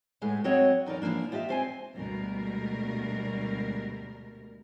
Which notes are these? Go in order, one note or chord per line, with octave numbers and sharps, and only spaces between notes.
A2 G#3 A3 B3
F#3 C4 F#4 C#5 D#5 F#5
E2 D#4 A#4 D5
E3 F3 A3 A#3 D4
F4 G4 D#5 E5
C4 C5 G#5
D2 B2 G3 G#3 A#4